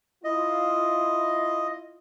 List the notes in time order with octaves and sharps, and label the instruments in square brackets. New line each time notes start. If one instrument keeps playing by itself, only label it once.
[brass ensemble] E4 F4 [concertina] D#5